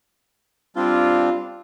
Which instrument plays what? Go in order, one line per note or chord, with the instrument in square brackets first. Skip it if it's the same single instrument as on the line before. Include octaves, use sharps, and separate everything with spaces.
[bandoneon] G3 C4 D4 [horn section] F4